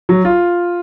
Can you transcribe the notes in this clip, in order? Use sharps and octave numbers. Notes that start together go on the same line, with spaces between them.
F#3
F4